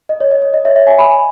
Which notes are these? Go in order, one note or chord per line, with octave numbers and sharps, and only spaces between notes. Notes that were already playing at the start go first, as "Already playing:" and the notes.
D#5
C#5
D#5
D#5
D#5
C#5 E5
C#5 E5
E5 G#5
G#5 B5